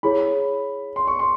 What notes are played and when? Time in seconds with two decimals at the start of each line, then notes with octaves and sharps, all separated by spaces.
0.03 E4 G#4 C#5 B5
0.96 C6
1.07 C#6
1.19 C6